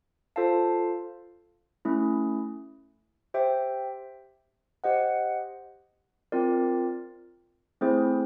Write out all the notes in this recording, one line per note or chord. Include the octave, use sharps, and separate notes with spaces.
F4 A4 C5 F5 A5
A3 C#4 E4
G4 C5 E5 G5
G4 C5 D#5 F#5
C4 F4 A#4 D5
A3 C4 E4 G#4 C5